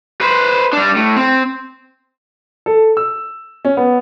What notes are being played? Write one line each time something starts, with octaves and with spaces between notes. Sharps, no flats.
B4 C5
G3 D4
A2
C4
A4
E6
C#4
B3